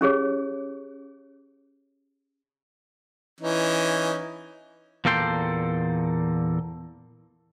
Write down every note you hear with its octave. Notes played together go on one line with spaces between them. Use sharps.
C#4 G4 G#4 C#5
E3 C#4 D#4
E2 A#2 A#3 A4 G5 C6